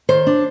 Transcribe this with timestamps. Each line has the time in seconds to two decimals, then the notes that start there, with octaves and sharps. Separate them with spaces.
0.09 D#3 C5
0.27 D4